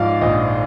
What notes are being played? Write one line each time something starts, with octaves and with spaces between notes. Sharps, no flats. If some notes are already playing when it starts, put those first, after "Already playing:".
Already playing: G#2 F3 D5 F5
A#1 D#5